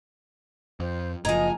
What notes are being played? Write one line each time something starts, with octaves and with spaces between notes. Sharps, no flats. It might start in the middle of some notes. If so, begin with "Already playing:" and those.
F2 C5
F#1 F3 D#5 G#5 A#5